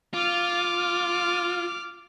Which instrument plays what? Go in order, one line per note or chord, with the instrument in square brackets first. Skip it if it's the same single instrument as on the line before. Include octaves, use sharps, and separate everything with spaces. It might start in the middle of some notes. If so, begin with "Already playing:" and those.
[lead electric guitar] F4 [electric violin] D6 F6